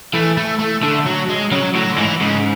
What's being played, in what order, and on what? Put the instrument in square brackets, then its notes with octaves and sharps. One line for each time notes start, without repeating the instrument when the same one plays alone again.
[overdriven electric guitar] E3 [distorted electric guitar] A3
[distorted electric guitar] A3
A3
[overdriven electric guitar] D3 [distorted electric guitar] A3
[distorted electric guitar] F#3
G#3
[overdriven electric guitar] C#3 [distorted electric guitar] F#3
[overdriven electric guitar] A2 [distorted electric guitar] F#3
[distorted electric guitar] D3
[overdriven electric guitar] G#2 [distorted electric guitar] E3
[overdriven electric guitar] G#2 [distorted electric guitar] C#3